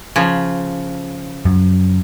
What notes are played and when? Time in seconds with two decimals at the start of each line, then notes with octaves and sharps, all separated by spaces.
0.16 C#3 F3
1.45 F#2